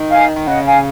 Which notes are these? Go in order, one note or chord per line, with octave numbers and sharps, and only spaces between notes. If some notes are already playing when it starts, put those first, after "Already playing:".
Already playing: D#3
F5 G#5
D#3
C#3 D#5 F#5
F5 G#5